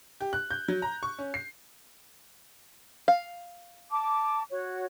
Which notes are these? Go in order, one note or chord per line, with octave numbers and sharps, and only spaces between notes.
G4
F#6
G6
F#3
A#5
C#6
C#4
C7
F5
A5 D6
F#4 C#5